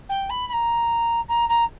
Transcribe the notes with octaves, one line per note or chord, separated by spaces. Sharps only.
G5
B5
B5
A#5
A#5
A#5